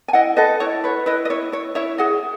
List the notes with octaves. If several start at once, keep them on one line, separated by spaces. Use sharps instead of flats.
G#5
E4 D#5 F#5
A4 B4 D#5
E4 C#5
B4 C#5
E4 B4 D#5
D#5
E4 C#5
E4 C#5
E4 C#5 E5
G#4 D#5 F#5